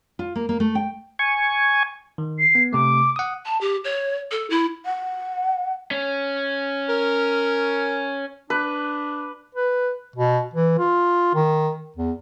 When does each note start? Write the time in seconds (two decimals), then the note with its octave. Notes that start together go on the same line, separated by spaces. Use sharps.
0.19 F4
0.35 A#3
0.49 A#3
0.60 A3
0.75 G5
1.19 G#5 C#6
2.18 D#3
2.39 C7
2.55 B3
2.73 C3 A3 D6
3.16 F#5 D#6
3.45 A5
3.61 G4
3.84 C#5
4.31 A4
4.50 E4
4.86 F#5
5.91 C#4
6.89 A#4
8.50 D4 B4
9.55 B4
10.16 B2
10.54 E3
10.79 F4
11.35 D#3
11.96 E2